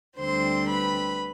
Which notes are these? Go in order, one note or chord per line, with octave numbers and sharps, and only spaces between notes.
D2 D3 G3 C4 C5 C6
B4 B5